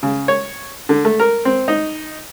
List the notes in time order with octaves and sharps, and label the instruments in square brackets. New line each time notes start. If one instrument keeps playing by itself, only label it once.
[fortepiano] C#3
C#5
D3
A3
A#4
C4
D#4